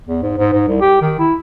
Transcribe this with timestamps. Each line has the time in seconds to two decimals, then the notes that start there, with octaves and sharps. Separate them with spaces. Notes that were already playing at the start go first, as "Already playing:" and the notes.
0.07 E2
0.23 G#2
0.38 G#2
0.53 G#2
0.68 C2
0.81 G4
1.01 D#3
1.19 E4